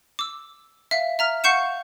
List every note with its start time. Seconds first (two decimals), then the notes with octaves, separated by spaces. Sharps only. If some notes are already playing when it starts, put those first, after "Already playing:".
0.19 D6 E6
0.91 E5 F5
1.19 E5 A#5 F6
1.44 F5 F#5 C#6 G6 C#7 E7